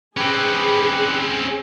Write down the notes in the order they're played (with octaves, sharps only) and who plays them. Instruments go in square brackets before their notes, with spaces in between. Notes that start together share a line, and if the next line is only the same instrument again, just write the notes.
[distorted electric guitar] C4 C#4 [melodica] G4 B4 [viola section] G#4